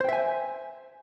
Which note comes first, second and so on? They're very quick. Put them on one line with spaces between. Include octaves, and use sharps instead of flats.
C5 G5 E5 G#5